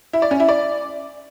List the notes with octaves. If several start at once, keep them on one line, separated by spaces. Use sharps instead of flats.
E4
D5
C#4
E4
D5